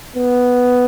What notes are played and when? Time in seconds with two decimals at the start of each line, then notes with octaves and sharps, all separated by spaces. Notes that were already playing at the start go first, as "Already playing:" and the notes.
0.16 B3